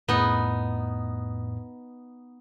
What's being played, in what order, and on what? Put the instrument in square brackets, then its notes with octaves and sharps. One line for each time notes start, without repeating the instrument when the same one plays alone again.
[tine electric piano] F2 A2 [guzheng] B3 D#4